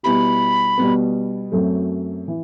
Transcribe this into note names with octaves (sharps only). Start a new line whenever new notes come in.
B2 G3 B3 E4 G4 B5
B2 G3 B3
F#2 F#3 A3 C4
E3